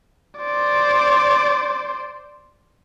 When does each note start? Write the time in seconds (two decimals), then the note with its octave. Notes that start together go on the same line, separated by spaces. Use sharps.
0.39 C5 D5